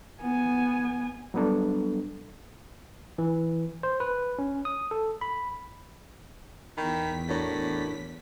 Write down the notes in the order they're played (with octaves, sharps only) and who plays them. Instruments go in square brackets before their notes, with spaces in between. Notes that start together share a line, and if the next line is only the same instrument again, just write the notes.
[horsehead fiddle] B3 G#5
[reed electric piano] F#3 G3 B3 D4 A4
[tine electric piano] E3
C5
B4
C#4
D#6
A4
B5
[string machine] E2 B6 [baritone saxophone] D#3 [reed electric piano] G5 B5
[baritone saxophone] A2 [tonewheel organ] D4 [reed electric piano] F#4 A#4 C#5